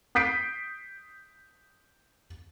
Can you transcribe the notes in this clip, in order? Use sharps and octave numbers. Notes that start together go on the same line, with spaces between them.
D#6 G6 B6 C7 D7